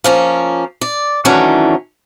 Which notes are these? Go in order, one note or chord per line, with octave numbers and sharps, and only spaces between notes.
F3 A#3 C#4
D5
D#3 E3 F#3 A3 C#4 D4